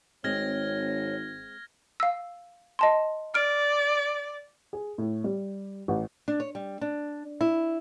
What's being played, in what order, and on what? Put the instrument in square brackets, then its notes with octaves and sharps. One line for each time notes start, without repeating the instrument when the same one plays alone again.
[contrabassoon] G#1 [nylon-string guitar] G#3 C4 [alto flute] C#5 [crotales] F6 G#6 A#6
[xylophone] F5 E6
D#5 A5 C6
[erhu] D5 [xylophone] F6 D7
[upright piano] G#4
A2
G3
A1
[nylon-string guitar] D4
C#5
G3
D4
E4